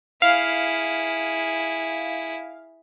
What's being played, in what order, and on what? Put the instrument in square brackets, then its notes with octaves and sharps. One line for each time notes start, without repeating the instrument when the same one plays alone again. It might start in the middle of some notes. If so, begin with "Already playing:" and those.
[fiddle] E4 G#4 [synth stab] F5